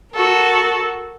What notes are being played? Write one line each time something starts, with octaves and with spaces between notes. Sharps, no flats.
F#4 A4 A#4